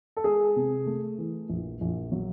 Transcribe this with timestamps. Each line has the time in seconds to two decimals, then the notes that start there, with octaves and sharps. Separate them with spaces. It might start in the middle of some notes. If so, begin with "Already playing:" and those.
0.17 A4
0.24 G#3 G#4
0.56 C3
0.86 A3
1.18 E3
1.49 A#1
1.81 A#1
2.12 F#3